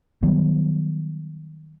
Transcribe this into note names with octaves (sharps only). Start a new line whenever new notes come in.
D#3 F#3 G3 B3